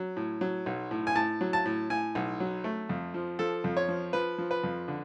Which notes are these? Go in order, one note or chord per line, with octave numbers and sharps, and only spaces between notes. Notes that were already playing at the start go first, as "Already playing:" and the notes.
Already playing: F#3
A2
F#3
B1
A2
G#5
A2 A5
F#3
A5
A2
A2 G#5
B1
F#3
A3
F2
F3
F3 A4
F2
C#5
F3
F3 B4
F3
B4
F2
D3